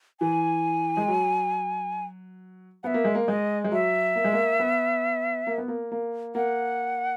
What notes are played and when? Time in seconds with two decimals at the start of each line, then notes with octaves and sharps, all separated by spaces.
0.21 E3 G#5
0.97 G#3
1.08 F#3
2.83 B3 E5 F#5
2.94 A#3
3.04 G#3
3.15 A#3
3.28 G#3 D#5
3.64 G#3
3.71 F#3 E5
4.15 A#3
4.24 G#3
4.33 A#3
4.59 B3
5.47 A#3
5.58 B3
5.68 A#3
5.92 A#3
6.35 A#3 F#5